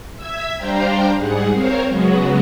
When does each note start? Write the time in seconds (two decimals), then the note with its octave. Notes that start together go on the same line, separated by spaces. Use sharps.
0.16 E5 E6 G#6 B6
0.57 G3 D4 C5 F5 G5 A#5
1.17 G#2 G3 G#4 F#5
1.52 C4 A#4 C5 C#5 F5
1.88 C#3 F#3 G#3 B3 F#4